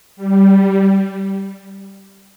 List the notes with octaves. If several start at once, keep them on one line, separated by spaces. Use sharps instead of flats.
G3